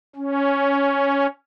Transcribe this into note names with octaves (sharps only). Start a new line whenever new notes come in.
C#4